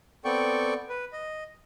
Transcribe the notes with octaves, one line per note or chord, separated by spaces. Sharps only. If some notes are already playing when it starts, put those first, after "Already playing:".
B3 C4 A4 D5 G5 C#6
B4
D#5